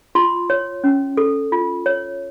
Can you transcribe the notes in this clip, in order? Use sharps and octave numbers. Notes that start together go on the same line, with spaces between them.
F4 C6
C#5
C#4
A4
F4
C#5